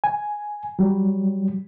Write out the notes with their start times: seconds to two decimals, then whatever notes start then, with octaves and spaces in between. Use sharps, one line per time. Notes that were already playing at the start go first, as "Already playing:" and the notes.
0.04 G#5
0.79 F#3 G3